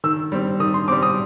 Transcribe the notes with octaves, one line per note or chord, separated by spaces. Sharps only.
D#3 E6
G3 C4
D#3 D#6
C6
G3 C4 D6
D#6